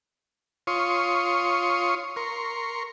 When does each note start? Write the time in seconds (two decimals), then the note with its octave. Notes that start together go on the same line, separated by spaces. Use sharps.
0.67 F4 C#5 C6 C#6 D#6
2.16 A#4 C6 C#6